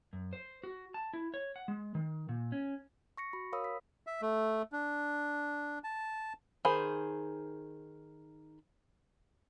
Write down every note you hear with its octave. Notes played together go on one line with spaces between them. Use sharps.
F#2
C5
F#4
A5
E4
C#5
F#5
G#3
D#3
A#2
C#4
C#6 A#6 C#7
F#4 B5
A#4 C#5 F5 B5 D#6 E6
B6
E5
A3
D4
A5
D#3 G#4 C5 B5